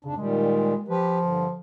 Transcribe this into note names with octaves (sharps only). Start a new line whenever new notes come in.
F2 G#2 C#3 D4
A#2 D#3 G3 G#3
F3 G4 B4
G2 D3